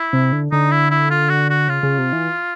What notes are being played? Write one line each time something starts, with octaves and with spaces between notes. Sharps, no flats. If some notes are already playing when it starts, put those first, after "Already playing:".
Already playing: E4
C3
D3
D3 D#4
E4
E4
F4
F#4
F#4
C#3 F4
C#3
C3
E3